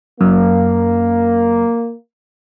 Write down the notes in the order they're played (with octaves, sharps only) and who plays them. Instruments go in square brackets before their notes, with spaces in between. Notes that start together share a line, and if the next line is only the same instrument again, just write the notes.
[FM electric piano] F#2 [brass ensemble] A#3